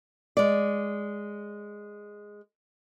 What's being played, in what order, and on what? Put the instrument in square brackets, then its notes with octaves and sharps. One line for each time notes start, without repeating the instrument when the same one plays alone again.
[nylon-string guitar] G#3 D5